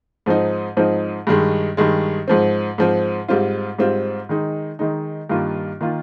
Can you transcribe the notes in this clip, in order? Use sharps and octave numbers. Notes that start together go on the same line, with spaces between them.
G#2 F3 C4 D#4
G#2 F3 C4 D#4
G2 D#3 G#3
G2 D#3 G#3
G#2 F3 C4
G#2 F3 C4
G#2 G3 C4 F4
G#2 G3 C4 F4
D#3 G#3 D#4
D#3 G#3 D#4
G2 D#3 A#3 F4
D#3 A#3 F4